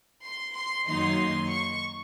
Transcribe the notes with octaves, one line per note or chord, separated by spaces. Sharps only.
C6
C6
F#2 D#3 F#3 A#3 D#4 C6
C#6